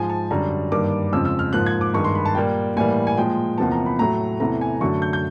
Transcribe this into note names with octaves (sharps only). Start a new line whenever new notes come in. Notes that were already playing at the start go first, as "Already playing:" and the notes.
Already playing: G#2 F3 G#3 G#5
A5
F#2 D3 G3 A#5
G2 D#3 G3 A#3 D6
F2 C#3 F3 G#3 E6
E6
F6
G#2 F3 A#3 F#6
G#6
D6
G2 D#3 G#3 C#6
C6
B5
A5
A#2 G3 A#3 G5
A2 E3 G3 A#3 G#5
G#5
A#2 F3 G#3 G5
E2 C3 F3 A#3 A5
A#5
B5
A2 F#3 A3 A#5
E2 C3 E3 A3 A#5
G#5
F#2 D3 F#3 A3 C#6
G6
G6